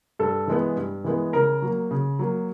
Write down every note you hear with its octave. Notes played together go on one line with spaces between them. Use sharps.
G2 A4
E3 G#3 B3
G2
E3 G#3 B3
C#3 A#4
F#3 A#3
C#3
F#3 A#3